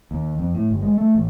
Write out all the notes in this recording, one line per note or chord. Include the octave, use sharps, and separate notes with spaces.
D#2
F2
A2
G1
G#3
A3
A1